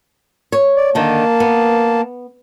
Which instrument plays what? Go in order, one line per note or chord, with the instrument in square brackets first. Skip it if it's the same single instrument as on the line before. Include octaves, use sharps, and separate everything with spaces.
[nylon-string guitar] C#5
[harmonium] D5
[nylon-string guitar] D3 D#3 [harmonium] A#3 A5
[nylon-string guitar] B3